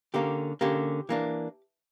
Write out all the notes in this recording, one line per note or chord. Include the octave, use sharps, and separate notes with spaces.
D3 A#3 C#4 G4
D3 A#3 C#4 G4
E3 A#3 D4